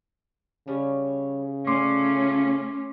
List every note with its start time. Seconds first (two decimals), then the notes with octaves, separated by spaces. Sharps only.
0.68 C#3 G3 C#4 C#5
1.67 D3 A3 C#4 F4 C6 D6 C7